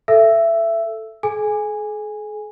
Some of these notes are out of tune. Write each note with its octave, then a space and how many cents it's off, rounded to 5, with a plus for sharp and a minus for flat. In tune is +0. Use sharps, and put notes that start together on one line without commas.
A4 +0 E5 +20 E6 +0
G#4 +45 G#5 -10